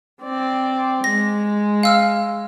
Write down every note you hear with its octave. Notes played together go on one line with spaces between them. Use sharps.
C4 D5
G#3 A#6
F5 E6 F6